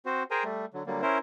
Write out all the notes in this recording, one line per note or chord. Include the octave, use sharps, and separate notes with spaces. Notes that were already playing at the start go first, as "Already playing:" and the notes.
C4 F#4 C5
G#4 A#4 C5 G5 G#5 A#5
G3 A3
D3 F#3
D3 F#3 G3 A#3
C#4 E4 A#4 C5